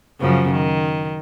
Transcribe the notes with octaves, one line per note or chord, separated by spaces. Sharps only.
F#2 C#3 F3
D#3